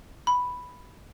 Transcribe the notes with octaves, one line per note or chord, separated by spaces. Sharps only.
B5